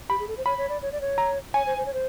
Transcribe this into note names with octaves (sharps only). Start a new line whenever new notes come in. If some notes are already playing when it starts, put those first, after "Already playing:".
G4 B5
G#4
A4
C5
C#5 B5
C#5
D5
C#5
D5
C#5
A#5
C#5 G#5
C5
C5
C#5
C5